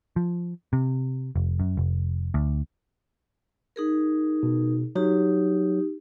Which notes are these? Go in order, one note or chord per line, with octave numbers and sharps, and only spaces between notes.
F3
C3
F1
F#2
F1
D2
D#4 G#4 A#4
B2
F#3 D#4 G4